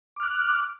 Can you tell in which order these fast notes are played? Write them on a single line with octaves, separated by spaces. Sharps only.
D6 F6 F#6